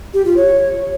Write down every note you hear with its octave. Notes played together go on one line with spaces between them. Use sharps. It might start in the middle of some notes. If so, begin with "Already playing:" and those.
G4
F4
C#5